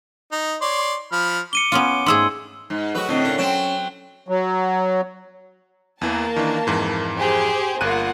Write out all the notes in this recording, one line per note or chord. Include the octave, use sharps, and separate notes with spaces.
D#4
C#5 D5 C6
F3 B5 F6
D6 C#7 D#7 G7
B3 C#4 F4
G#2 A3 G#4 C6 E6
G#2
F#3 G#3 A3 F#4 B4
A2 D3 C4 D#5
C#4 D4 A#4
F#3 C4 C#4 G5 A5
F#3
E2 E3 A#3 A5
D#3 E3 D4
F2 G#2 E3
G4 G#4 C5
G1 A#3 F4 F#5 F#6 D#7